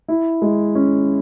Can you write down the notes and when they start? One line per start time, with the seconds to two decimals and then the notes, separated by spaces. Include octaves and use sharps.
0.08 E4
0.42 G#3
0.75 C#4